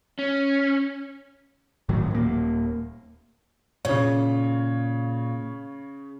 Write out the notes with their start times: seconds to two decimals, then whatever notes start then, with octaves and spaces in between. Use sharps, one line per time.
0.19 C#4
1.89 G#1 A2 D#3 F#3
2.11 D#1 A#3
3.85 A#2 C#3 C#5